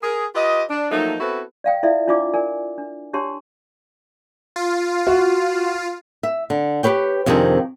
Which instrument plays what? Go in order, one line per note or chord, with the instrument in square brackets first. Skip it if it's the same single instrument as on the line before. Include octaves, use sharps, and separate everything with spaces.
[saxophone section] G#4 A#4
F4 G4 B4 D#5
D4
F3 F#3 A3 A#3 D#4
B3 C4 E4 F#4 A4 B4
[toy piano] D5 F5 G5
E4 F4 A4 D5 E5
D4 E4 F4 D5 D6
A#4 D5 G#5
D4
D4 G4 C#5 A5 C6
[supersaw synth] F4
[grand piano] F#4
[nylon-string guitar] E5
D3
G4 G#4 B4 C#5 G5
F2 C3 D#3 D4 G#4